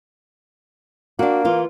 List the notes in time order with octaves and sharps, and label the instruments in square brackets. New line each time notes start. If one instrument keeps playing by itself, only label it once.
[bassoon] A#3 [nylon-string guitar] D4 F#4
[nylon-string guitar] E3 F4